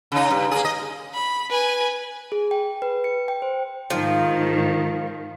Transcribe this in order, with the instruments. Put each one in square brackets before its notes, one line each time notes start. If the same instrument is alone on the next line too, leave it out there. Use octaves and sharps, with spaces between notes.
[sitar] C#3 D#4
G2
A#3 G#4
D#5
[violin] B5
B4 G#5
[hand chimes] G#4
G5
B4
C#7
G5
C5
[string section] G#2 D#3 [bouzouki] F3